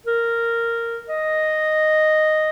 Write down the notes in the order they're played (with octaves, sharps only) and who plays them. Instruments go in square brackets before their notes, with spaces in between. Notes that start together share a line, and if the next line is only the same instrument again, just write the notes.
[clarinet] A#4
D#5